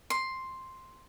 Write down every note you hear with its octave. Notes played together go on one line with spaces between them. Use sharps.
C6